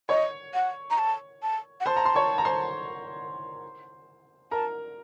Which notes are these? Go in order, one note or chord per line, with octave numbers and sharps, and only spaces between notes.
C#5 D#5 C#6
F#5
A#5
A5
A5
F#5
C5 A5 C6
A#5
C6
C#5 C#6
A#5
C5 C6
A#4 A5 A#5